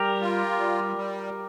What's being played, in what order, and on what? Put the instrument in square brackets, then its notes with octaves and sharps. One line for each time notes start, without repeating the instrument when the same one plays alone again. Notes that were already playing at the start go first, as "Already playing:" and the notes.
Already playing: [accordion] G3 [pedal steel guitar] G4 A#4
[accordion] F4
G3
G3